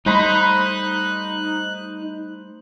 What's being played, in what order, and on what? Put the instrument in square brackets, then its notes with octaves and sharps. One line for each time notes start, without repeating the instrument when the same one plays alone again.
[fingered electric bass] G3 A3 [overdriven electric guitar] D#4 [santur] C5 B5 [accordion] F#6